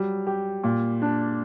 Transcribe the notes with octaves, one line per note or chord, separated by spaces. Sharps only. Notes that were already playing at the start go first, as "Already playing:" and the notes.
Already playing: F#3 G3
G4
A#2
D4